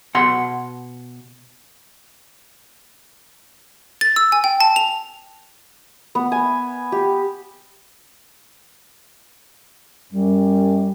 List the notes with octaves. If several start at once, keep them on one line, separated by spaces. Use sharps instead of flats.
B2 F#5 C6
A6
E6
G#5
G5
A5
F7
B3
G#5
G4
F#2 G3